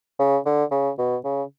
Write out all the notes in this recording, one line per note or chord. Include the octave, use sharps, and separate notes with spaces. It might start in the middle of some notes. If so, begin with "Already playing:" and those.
C#3
D3
C#3
B2
C#3